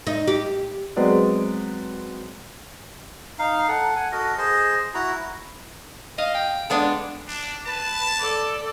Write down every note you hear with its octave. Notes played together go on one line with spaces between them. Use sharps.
D#4
G4
F#3 G#3 B3 C4 D5
D#4 F5
A4 F#5
F#5 G#5
F#4 A4 A#4 D#5
G#4 C5 D#5
E4 F#4 A#5
D#5 F5
G5
G#3 B3 D4 A4
D4
B4 A5
A4 D5